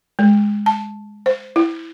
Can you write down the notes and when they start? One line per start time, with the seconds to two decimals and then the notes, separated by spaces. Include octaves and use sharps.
0.19 G#3
0.66 A5
1.26 C5
1.56 E4